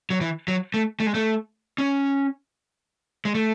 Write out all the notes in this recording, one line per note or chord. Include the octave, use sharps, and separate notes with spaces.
F#3
E3
F#3
A3
A3
G#3
A3
C#4
G#3
A3